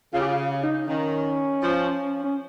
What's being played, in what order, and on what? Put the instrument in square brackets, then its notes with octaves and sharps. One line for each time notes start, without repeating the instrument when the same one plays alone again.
[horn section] C#3 [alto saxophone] F4
[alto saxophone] G4
F4
D#4
[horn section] D#3 [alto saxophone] C#4
[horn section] F3
[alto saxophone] C#4